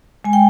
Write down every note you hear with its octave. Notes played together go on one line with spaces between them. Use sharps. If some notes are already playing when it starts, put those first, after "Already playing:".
G#3 G#5
G5